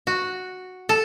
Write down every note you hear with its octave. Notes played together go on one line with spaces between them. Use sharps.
F#4
A4